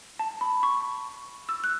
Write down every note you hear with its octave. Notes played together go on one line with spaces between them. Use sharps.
A5
B5
C#6
E6
F#6